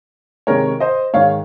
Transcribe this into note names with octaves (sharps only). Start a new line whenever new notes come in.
C3 D#3 G#3 A#4 C#5
C5 D#5
G#2 D#3 G#3 C#5 F5